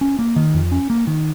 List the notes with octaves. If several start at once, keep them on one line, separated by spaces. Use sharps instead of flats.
C#4
A#3
D#3
F2
C#4
A#3
D#3